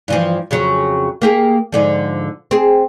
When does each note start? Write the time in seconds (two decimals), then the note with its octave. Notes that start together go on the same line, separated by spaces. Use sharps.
0.08 G2 E3 F3
0.51 F2 C#3 F#3
1.22 A#3 G4 G#4
1.72 G#2 D3 F3
2.51 C4 G#4